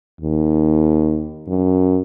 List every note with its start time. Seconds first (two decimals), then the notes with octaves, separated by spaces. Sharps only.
0.21 D#2
1.47 F#2